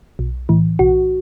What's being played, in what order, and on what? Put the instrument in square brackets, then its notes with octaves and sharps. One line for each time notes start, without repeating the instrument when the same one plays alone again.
[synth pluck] B1
A2 E3
B1 F#4